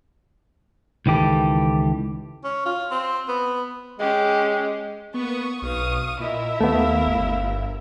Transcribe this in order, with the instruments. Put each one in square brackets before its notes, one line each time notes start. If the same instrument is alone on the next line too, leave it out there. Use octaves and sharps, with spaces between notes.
[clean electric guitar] C#2 D#3 E3 G4 A4
[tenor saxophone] C#4
F4
C4
B3
[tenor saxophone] G#3 [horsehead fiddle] C#4 G4
[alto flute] A#3 [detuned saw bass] B3 [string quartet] C#6 D#6
[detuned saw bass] B1 [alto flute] B4 [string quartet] F5 C#6 D#6
[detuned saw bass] A#2 [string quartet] E4 A#4 E5 [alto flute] D#5
[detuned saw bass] D#2 [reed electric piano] A3 B3 [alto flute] F5
[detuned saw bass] G1